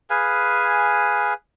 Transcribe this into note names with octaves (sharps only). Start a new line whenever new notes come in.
G#4 B4 F5 G#5